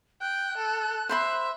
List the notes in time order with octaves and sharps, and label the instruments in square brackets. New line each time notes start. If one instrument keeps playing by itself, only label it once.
[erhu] G5 [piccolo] F#6
[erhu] A4
[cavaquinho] C5 B5 C6 [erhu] E5